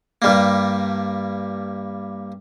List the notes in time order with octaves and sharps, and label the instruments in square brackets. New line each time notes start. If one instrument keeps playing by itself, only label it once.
[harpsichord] G2 G3 A#3